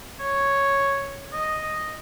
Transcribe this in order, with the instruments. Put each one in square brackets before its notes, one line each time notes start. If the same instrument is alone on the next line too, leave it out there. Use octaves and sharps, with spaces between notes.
[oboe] C#5
D#5